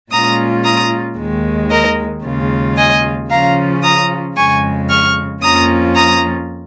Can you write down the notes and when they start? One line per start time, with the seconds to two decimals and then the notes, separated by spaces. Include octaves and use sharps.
0.11 A#2 G#3 C#4 F4 A#5 D#6
0.64 A#5 D#6
1.18 D#2 D#3 G#3
1.70 A#4 D#5
2.23 D#2 C#3 G#3 F4
2.76 D#5 G#5
3.29 C#3 F3 C#4 F4 F5 A#5
3.82 A#5 D#6
4.36 F2 C#3 G#3 G#5 C#6
4.89 C#6 F6
5.42 F2 F3 A#3 C#4 F4 A#5 D#6
5.95 A#5 D#6